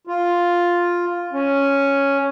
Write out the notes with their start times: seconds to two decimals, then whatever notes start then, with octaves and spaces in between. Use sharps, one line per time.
0.07 F4
1.33 C#4